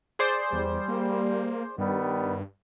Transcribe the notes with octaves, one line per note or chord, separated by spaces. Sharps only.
G#4 C5 D5
E2 G3
A#3
G2 D#3 G3 B3